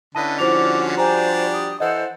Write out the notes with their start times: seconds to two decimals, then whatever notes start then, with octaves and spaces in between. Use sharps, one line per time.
0.15 D3 C#4 E4 B4 D#5 A5
0.39 F3 G3 E4 F#4 C5 D6 F7
0.98 D4 G4 C5 G#5 A#5
1.53 D#6
1.80 E3 A4 C5 D#5 F#5